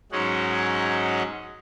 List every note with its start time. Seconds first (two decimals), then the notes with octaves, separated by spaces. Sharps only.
0.12 G#2 F#3 G#3 C#4 D#4 F#5